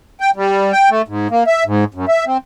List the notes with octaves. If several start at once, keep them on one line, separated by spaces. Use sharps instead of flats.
G5
G3
G5
A3
G#2
A#3
E5
G#2
F#2
E5
C4